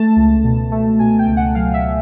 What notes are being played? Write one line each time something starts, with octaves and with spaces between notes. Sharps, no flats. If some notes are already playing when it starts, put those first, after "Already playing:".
Already playing: A3 A5
C#2
B2
A3
B2 G#5
G5
C#2
F#5
F#3 F5
E5